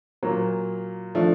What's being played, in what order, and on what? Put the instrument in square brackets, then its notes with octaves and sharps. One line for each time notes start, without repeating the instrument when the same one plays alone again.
[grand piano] A#2 F#3 A#3
F3 A3 D4